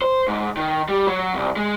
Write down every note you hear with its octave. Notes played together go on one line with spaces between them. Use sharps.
C5
G#2
D#3
G3
F#3
C2
G#3